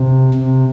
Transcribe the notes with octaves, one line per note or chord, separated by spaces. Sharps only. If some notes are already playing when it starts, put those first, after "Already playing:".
Already playing: C3
C3